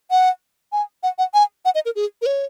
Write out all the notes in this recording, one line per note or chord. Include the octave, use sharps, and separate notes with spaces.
F#5
G#5
F#5
F#5
G#5
F#5
D#5
A#4
G#4
A#4
C#5